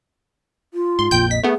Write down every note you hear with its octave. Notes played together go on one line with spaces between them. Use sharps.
F4
G#2 C6
A#1 F2 A#2 G5 G6
D#5 B6
A3 B3 G#4